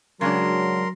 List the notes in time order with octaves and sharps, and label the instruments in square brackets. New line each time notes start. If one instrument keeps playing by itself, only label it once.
[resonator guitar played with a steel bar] C#3 G#3 D4 [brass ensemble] F#3 [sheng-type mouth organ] A#4 C6